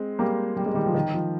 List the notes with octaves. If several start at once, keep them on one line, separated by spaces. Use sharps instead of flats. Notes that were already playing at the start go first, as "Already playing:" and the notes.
Already playing: G#3 C4
G3 A#3
G3
G#3
D#3 G3
F3
D#3
F3